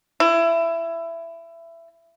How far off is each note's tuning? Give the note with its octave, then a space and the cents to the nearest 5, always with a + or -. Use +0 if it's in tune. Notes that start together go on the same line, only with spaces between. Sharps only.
E4 +20